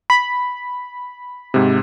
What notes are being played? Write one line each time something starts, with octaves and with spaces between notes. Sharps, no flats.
B5
G#2 C3